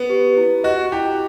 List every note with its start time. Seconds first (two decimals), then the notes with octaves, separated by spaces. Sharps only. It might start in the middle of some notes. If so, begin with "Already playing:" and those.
Already playing: B3
0.10 G4
0.37 E4
0.64 F#4 D#5
0.92 E4 G4